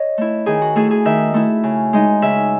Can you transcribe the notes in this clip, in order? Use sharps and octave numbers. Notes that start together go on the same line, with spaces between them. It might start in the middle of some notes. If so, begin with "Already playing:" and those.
Already playing: C#5 D#5
A3 E4
D#3 G#4
F#4
A3 E4 G#4
G#4
D#3 E5
A3 E4
C#3
G#3 D#4
C#3 E5